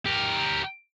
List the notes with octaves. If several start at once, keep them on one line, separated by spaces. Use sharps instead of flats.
G4 A#4